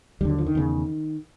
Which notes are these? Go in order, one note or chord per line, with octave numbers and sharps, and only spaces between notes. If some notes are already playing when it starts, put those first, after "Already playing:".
D#2 D3 F#3 G3
F3
D#3
E2 C#3